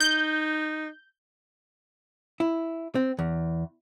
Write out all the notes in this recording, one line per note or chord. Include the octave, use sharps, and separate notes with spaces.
D#4 G6
E4
C4
E2